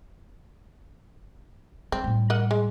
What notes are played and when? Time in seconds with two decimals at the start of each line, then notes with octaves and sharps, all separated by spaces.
1.92 G3 C4
2.04 A2 G3
2.30 A#4 D#5 F#5
2.51 G#3